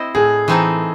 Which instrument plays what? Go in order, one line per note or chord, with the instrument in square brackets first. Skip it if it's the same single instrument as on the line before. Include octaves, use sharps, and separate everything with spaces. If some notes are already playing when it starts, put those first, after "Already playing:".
Already playing: [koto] C4 E4 C5 D#5
[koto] A2 [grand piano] G#4
[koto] E3 C4 D#4 A4